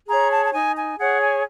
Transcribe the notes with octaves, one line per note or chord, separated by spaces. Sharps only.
G#4 C#5 A#5
A5
A5
D#4 G#5
G#5
G#4 C#5 F#5
G#5